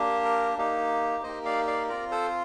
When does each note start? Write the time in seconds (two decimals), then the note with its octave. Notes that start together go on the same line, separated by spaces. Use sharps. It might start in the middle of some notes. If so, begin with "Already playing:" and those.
Already playing: A#3 D4 G4
0.25 A#4
0.58 A#3 D#4 G4
1.23 A#3 D#4 G4 C5 D#5
1.46 D5 F5
1.67 D5 F5
1.89 C4 F4 A#4 D5
2.11 A4 C5